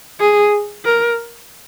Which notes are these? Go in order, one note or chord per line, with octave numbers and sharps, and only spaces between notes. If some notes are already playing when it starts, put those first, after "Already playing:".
G#4
A#4